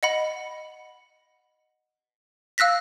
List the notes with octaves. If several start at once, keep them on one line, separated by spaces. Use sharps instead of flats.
D#5 F#5 B5
F5 E6 F#6 A#6 B6